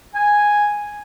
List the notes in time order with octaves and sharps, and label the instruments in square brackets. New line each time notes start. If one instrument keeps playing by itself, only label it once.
[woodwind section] G#5